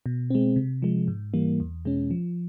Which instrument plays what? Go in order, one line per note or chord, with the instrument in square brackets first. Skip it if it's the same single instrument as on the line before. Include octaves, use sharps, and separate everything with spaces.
[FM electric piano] B2
G#3 C4
C3
F3 G#3
G#2
E3 G3 A#3
E2
B2 G#3 C#4
F3